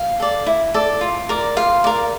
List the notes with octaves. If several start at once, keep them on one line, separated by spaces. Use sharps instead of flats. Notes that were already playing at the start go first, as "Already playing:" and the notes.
Already playing: F5
A4 D5
E4
A4 D5
F4
A#4 D5
F4 F5
A#4 D5